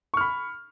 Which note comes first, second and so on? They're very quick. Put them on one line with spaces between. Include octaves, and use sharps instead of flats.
C#6 F6 B5